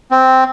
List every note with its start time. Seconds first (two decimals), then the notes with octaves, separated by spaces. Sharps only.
0.11 C4